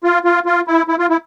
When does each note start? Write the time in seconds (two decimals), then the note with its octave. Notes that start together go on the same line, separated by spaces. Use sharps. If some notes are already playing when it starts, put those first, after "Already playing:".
0.04 F4
0.25 F4
0.46 F4
0.68 E4
0.88 E4
0.99 F4
1.09 E4